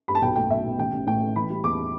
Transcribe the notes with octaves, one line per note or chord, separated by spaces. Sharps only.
G2 B5
A5
B1 G5
A3 G5
B1 E5
B2
A1 G5
A1
A2 G5
A3
E3 B5
G3
E2 D6